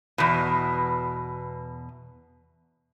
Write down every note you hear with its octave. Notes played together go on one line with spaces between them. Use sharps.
E2 B2